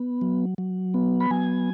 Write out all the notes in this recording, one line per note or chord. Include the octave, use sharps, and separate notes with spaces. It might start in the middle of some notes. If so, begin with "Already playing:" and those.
Already playing: B3
F#3
F#3
B3
B5
F#3 G#5